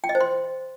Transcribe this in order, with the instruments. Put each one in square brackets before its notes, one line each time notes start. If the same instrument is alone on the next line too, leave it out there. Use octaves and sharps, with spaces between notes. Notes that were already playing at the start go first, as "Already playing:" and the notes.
[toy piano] G5
D#5
C5
C6